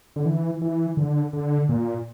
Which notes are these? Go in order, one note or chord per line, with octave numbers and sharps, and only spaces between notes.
D3
E3
E3
D3
D3
A#2